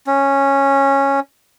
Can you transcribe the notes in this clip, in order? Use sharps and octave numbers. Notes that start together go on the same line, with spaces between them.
C#4